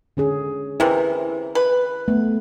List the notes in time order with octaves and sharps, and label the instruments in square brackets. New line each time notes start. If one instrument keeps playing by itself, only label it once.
[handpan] D3 C#4 G#4
[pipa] C3 E3 [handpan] E4 A#4
[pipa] B4
[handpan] A3 B3